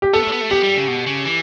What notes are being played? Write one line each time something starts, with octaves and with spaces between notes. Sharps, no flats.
G4
B3 A4
A3
B3
A3
B3 G4
G3
C#3
B2
C#3
E3